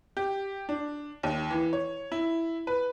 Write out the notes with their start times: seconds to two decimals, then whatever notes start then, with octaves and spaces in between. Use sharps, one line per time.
0.17 G4
0.69 D4
1.23 D#2
1.51 E3
1.73 C#5
2.12 E4
2.67 B4